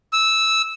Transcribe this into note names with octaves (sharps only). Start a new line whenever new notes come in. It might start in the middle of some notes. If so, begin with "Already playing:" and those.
E6